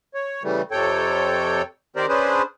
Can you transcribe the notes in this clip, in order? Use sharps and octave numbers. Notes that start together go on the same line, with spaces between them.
C#5
C#3 E3 G3 A3
F2 C3 A4 C#5 G5
D#3 C4 G4 A#4 C5 D5
C#4 D4 G#4 B4 C5